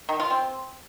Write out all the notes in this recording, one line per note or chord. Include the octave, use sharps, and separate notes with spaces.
D#3
F4
C4